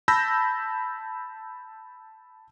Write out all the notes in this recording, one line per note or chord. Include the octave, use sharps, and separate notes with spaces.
A5 B5 E6 G6 A#6